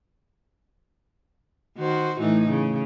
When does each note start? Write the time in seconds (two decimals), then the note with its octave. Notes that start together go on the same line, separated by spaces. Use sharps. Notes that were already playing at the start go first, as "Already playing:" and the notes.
1.77 D#3 F#4 C5
2.20 A2 E3 D#4
2.50 C#3